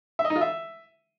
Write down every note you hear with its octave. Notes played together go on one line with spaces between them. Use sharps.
E5
D#5
D#4
F4
E5